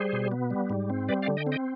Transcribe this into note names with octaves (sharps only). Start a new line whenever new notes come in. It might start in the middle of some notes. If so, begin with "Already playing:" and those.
Already playing: G3 G#4 C5
B2
B3
G3
G#2
C4
G3 B4 D5
D5 F5
D3
D#5 G5
C4
D#5 G5